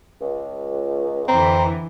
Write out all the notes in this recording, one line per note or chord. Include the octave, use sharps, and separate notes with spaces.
C#2
F2 D3 E3 C4 A#5